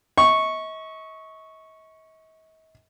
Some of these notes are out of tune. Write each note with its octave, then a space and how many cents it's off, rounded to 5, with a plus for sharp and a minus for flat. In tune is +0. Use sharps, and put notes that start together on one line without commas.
D#5 +45 C#6 -5